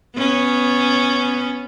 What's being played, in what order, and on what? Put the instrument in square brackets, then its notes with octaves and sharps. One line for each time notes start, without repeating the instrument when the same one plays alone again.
[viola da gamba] B3 C#4